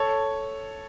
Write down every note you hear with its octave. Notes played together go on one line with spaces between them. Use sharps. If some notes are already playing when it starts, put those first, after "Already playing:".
Already playing: A4 C#5